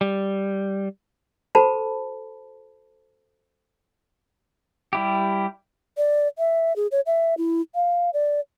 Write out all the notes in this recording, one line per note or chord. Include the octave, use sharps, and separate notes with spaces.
G3
F#4 A4 C5 A5 B5
G3 E4 G4
D5
E5
G#4
C#5
E5
E4
F5
D5